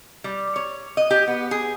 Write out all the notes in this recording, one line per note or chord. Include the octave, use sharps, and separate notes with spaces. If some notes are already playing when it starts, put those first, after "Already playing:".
G3
C#5
D#5
G4
B3
G#4